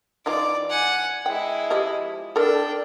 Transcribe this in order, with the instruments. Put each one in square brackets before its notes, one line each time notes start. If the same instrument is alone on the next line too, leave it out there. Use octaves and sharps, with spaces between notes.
[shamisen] E3 D#4 F4 [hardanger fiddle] D5 D6
[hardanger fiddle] F#5 G#5
[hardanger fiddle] G#3 E4 [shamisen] G5
[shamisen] F3 G4 D#5
[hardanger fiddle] D4 G5 [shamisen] A4 A#4